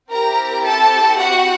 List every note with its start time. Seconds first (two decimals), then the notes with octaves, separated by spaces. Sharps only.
0.10 C4 E4 G4 A#4 A#5
0.64 A4 A5
1.18 F#4 F#5